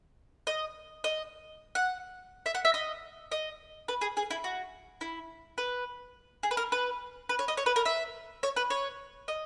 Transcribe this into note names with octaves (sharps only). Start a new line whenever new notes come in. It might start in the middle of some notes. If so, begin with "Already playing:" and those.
D#5
D#5
F#5
E5
F#5
E5
D#5
D#5
B4
G#4
G#4
E4
F#4
E4
B4
G#4
B4
A#4
B4
B4
C#5
D#5
C#5
B4
A#4
E5
C#5
B4
C#5
D#5